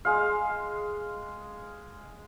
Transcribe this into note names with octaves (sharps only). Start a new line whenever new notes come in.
G#3 F5